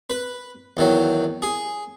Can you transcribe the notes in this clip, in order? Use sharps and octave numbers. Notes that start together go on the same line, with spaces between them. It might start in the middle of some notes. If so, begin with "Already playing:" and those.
B4
E2 D#3 F#3
G#4